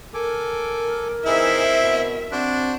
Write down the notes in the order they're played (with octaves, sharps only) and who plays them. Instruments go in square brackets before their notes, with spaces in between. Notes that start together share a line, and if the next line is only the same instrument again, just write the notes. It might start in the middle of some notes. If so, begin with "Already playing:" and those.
[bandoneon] A4 G#5 D6 [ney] A#4
[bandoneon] E3 D#4 G#4 [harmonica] C4 E4 [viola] E5
[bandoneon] B2
[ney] C4 [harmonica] D4 [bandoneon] F#4 C5 F#6